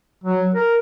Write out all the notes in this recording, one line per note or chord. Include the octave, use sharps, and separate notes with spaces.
F#3
A#4